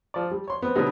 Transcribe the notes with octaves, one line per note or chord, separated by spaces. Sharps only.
F3 D5
G3
C#5 C6
B3 C4
B2 D3 F#3 G3 B3 D#4